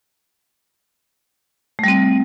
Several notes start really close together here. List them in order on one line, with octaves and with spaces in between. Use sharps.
A3 G3 C4